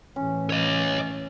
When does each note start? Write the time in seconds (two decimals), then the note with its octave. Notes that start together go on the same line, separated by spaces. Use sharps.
0.16 A2 E3 C#4
0.50 C#5 D#5